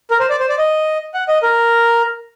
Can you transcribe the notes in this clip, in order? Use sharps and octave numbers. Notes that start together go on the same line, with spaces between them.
A#4
C5
D5
C5
D5
D#5
F#5
D#5
A#4